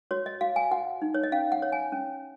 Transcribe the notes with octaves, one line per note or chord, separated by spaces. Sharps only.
F#4 C#5
D#5
F#4 F5
G#5
F#4 F#5
D#4
C#5
D#5
C#4 F5
F#5
C#5
G#5
C#4